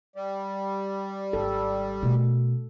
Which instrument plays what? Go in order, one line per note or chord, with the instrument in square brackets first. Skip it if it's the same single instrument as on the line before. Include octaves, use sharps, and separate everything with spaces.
[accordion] G3
[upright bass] G#1 [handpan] A4
[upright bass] B2 A3